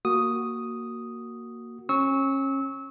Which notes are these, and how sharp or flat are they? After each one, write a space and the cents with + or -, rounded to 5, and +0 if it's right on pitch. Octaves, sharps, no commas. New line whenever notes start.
A#3 +0 F#4 +0 D#6 +0
C#4 -35 C#6 +0 E6 -30